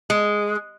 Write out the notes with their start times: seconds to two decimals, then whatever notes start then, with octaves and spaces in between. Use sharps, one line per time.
0.10 G#3